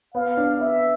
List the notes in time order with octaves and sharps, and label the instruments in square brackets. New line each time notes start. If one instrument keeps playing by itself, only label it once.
[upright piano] B3 [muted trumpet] F5
[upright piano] D4
[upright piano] B3 [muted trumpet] E5